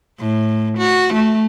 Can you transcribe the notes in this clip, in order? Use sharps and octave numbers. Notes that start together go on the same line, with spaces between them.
A2
F#4
A3